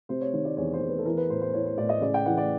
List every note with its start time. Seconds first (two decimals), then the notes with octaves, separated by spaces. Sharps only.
0.09 C3 C5
0.21 C#5
0.33 D#3 C#5
0.45 D5
0.57 E2 C#5
0.73 C5
0.81 E2
0.89 B4
0.98 A4
1.05 E3 A#4
1.17 B4
1.30 A2 C5
1.42 C5
1.53 E3 C#5
1.66 C5
1.78 A2 D5
1.89 D#5
2.01 C#3 D5
2.14 G5
2.26 E3 F#5
2.37 D5